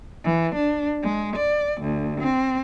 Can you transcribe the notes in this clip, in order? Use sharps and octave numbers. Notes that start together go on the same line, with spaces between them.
E3
D4
G#3
D5
D2
C4